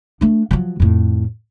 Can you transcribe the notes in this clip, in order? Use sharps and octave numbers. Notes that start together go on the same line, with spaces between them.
A3 D4
F3 F#3
F2 A2